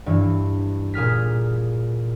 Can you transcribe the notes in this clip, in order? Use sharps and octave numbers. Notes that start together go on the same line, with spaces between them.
G2 E3
A#2 G#4 F6 B6